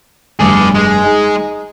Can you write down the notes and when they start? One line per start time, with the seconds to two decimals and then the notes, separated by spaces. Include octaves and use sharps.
0.40 F1 G2 G#4 D5 C#7
0.75 G#3
1.04 D#4 G#4